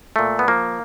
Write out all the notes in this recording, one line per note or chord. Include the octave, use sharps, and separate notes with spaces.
A#2 A3
B3
F3 A#3